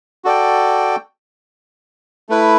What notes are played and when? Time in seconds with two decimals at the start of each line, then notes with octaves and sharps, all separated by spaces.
0.24 F#4 A4 D5 G5
2.29 A3 E4 B4